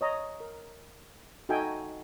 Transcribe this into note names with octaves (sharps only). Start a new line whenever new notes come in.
C#5 D#5 A#5
A#4
D#4 F#4 A4 E5 G5 G#5